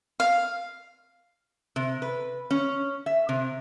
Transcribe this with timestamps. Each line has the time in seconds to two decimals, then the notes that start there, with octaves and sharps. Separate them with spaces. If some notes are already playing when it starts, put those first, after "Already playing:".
0.20 F5
1.76 C3
2.02 B4
2.51 C#4
3.06 E5
3.29 C3